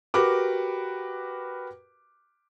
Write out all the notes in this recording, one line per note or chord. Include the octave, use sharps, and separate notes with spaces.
F#4 G4 A#4 B4 D6